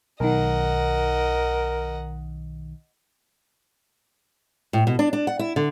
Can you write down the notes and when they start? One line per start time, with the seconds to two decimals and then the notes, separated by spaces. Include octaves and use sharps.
0.20 B1 D#3 A#4 D#5 F#5
4.73 A2
4.87 B2
4.99 D4
5.13 D4
5.27 F#5
5.39 E4
5.56 D3